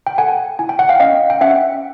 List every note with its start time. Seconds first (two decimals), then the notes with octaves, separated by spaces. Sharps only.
0.07 G5
0.18 A4 F#5 G#5
0.59 E4 G#5
0.69 G5
0.79 F#5
0.89 F5 G5
1.00 C#4 D#5 F5
1.30 G5
1.41 C#4 E5 F#5